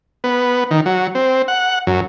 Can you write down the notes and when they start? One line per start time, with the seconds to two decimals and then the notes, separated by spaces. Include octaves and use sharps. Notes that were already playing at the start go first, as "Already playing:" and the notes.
0.24 B3
0.71 D#3
0.86 F#3
1.15 C4
1.48 F#5
1.87 F#2